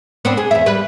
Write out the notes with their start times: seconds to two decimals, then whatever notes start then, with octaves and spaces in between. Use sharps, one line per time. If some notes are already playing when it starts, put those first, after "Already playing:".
0.25 B3 C4 D4
0.37 G#4
0.51 E2 E5
0.66 G3 B4